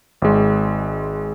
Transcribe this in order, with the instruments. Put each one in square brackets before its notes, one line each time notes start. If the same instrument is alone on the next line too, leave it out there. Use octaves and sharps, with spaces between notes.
[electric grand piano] G#1 G#3